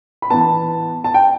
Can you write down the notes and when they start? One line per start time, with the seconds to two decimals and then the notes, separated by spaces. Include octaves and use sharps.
0.22 B5
0.30 E3 B3 A5
1.04 A5
1.14 G5